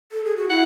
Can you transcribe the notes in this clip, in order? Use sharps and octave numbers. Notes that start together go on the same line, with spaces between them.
A4
G#4
F#4
E4 F#5